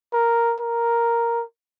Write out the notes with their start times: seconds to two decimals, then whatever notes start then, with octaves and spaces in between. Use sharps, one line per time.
0.13 A#4
0.61 A#4